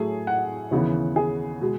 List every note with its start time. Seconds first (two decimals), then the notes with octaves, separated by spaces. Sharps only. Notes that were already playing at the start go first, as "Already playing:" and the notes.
Already playing: A2 F#3 A3 G#4
0.27 F#5
0.71 D#2 C#3 E3 B3
1.16 G#4
1.61 B2 G#3